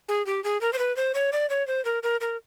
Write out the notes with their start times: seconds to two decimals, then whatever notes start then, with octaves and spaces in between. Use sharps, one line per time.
0.09 G#4
0.26 G4
0.44 G#4
0.61 A#4
0.73 C5
0.79 B4
0.96 C5
1.15 C#5
1.33 D5
1.50 C#5
1.67 C5
1.85 A#4
2.03 A#4
2.21 A#4